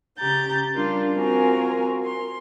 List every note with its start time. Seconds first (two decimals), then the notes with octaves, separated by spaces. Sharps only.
0.18 C#3 G4 A#5 G6 A6
0.73 G3 D4 F4 A#4
1.16 C4 F4 F#4 A#4 G#5 A#5
2.04 C6